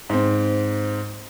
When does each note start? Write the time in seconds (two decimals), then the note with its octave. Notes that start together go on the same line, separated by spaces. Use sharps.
0.10 G#2 C4